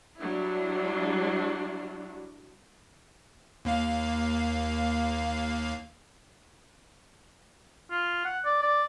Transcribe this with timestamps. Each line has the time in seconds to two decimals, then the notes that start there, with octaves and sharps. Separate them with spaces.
0.20 F#3 G3 D4 E4
3.65 D#2 A#3 F5
7.91 F4
8.25 F#5
8.45 D5
8.62 D5